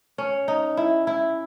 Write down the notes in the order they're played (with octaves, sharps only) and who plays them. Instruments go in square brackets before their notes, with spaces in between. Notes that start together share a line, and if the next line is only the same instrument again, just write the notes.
[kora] C#4
D#4
E4
E4